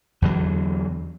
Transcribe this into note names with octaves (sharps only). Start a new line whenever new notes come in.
E2 D3 F#3